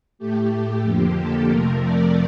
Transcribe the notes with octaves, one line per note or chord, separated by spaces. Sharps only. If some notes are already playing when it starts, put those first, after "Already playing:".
A2 A3 G4
G4
F2 D3 F3 A#3 G4
A4
F2 C3 F3 A3 A#4
D5